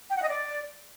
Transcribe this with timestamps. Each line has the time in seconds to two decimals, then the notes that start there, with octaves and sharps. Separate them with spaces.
0.10 G5
0.16 F#5
0.23 D#5
0.29 D5